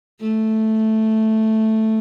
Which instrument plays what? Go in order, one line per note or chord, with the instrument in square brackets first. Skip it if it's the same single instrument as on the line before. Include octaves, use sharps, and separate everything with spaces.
[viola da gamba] A3